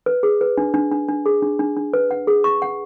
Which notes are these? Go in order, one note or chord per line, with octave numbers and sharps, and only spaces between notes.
B4
G#4
B4
D4
D4
D4
D4
G#4
D4
D4
D4
B4
F#5
G#4
C#6
F#5